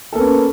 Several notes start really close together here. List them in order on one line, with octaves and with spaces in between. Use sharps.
A4 A#3 B3 C#4